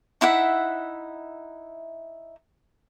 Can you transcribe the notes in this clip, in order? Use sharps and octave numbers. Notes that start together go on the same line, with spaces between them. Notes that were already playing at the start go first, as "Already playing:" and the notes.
D#4 E4 E5 F#5